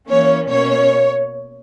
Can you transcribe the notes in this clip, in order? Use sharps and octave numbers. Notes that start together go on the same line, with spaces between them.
E3 A#3 C#4 C#5
B2 A#3 C#4 C#5